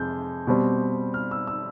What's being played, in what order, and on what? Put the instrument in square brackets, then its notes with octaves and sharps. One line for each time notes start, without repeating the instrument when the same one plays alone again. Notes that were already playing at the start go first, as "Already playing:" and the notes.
Already playing: [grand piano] F2 C3 G#3 G6
B2 G3 C4
F6
E6
E6